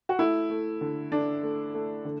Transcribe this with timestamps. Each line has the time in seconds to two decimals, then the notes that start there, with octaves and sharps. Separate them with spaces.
0.09 F#4
0.19 A3 E4
0.50 A3
0.81 D3
1.11 D3 D4
1.43 A3
1.74 A3
2.05 D3